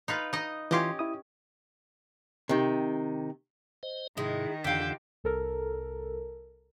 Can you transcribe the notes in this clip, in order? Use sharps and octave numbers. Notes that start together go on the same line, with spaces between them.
D#4 F4 B4
D#4 D#5
E3 C#4 F4 G4 D#5 C6
E4 D#6
C3 D#3
C5 D#5
G#2 C3 D#3 G#3 E4
F2 D3 E3 D4 F4 G4 G5
C2 A4 A#4